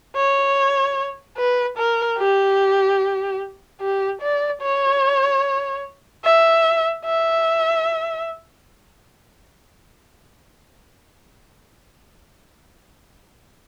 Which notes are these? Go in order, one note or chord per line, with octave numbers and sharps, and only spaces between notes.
C#5
B4
A#4
G4
G4
D5
C#5
E5
E5